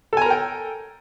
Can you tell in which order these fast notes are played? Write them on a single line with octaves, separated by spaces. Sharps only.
A4 G#5 A#5 A#4 G5